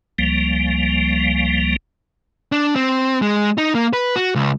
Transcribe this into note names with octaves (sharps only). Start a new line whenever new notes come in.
C#2 F3 G3 A#3
D4
C4
G#3
D#4
A#3
B4
F#4
C#2